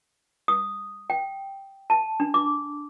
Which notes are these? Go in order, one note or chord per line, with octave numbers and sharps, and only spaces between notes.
D#6
G5
A5
D4
D6